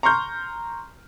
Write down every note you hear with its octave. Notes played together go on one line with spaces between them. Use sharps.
A#5 C6 C#6 F6 G6